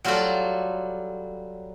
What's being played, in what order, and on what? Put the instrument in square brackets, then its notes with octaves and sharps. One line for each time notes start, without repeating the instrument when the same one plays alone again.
[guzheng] F#3 G3 F4 F#4 A4 D5